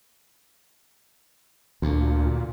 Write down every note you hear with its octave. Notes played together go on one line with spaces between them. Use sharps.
D2 A#2